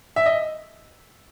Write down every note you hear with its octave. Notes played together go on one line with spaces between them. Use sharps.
E5
D#5